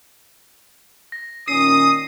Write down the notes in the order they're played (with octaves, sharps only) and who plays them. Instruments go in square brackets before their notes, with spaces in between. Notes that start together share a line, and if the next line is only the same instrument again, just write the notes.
[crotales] A#6
[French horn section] A#2 D#3 C#4 [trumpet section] D#6 [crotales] C7